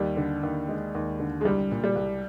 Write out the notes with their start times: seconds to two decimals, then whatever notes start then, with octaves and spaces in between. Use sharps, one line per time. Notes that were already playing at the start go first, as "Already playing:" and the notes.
Already playing: D#2 G3
0.17 D3
0.43 D#2
0.69 G#3
0.95 D#2
1.20 D3
1.41 G#3
1.45 C2 G3
1.71 A#2
1.84 G3
1.96 C2